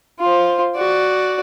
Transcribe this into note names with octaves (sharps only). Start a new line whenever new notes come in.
F4 C5
F#4 D5